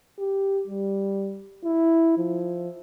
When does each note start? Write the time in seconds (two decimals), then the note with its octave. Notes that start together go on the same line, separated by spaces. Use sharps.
0.18 G4
0.67 G3
1.65 E4
2.18 F3